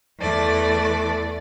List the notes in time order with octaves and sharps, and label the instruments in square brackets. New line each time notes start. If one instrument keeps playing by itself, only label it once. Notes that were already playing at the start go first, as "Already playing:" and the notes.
[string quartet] E2 A3 D5